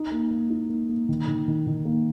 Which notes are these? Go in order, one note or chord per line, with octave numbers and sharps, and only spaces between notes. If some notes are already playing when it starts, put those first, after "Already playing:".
Already playing: D#4
A#3
A#3
D#4
A#3
A#3
D#3
D#3
D#3
D#3
A#3